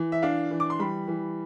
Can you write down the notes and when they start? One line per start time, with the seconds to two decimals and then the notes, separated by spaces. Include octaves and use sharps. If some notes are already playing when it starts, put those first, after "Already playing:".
Already playing: E3
0.12 E5
0.22 D4 F5
0.51 E3
0.60 D6
0.70 C6
0.79 G3 B5
1.08 E3